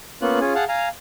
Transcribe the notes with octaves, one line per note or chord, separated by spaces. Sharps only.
A#3 B3 C#4 F4 F#6
C#4 F4 G#4 G#5
G#4 F5 F#5 A5
F5 G#5 A#5